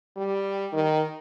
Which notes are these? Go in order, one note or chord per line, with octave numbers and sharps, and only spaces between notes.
G3
D#3